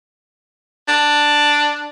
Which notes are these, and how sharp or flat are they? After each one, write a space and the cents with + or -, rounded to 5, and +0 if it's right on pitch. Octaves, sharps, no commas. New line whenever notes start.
D4 +5